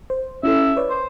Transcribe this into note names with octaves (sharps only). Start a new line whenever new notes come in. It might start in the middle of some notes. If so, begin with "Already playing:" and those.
C5
C#4 E4 A4 E5
B4 C#5 D5
C5